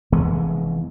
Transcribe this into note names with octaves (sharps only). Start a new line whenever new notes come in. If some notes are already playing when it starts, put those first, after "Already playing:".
F1 E3 G#3 B3